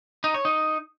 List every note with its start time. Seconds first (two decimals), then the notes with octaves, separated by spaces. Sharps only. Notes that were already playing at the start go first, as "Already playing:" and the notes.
0.24 D#4
0.34 C#5
0.45 D#4